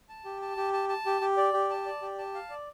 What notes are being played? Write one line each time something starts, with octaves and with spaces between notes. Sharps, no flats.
A5
G4
A5
G4
A5
A5
G4
G4
D5
G4
A5
D5
G4
A5
F5
D5